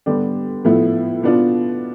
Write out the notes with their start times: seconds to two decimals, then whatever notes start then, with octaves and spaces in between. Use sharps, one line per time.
0.06 D3 G3 B3 D4 G4
0.64 A2 F3 B3 E4
1.23 B2 B3 D4 F4